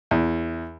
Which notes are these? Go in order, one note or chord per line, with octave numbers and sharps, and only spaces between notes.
E2